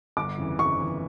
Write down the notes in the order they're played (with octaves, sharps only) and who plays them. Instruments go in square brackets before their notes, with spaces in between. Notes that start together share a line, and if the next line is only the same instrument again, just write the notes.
[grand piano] G1 [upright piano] D6
[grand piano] F2 C#3 E3
[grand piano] G1 [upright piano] C#6
[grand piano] F2 C#3 E3